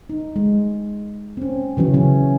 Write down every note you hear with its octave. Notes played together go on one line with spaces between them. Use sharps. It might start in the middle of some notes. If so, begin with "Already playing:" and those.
D#4
G#3
C4 C#4
C#3 E3 F#3 C#4
C#3 C#4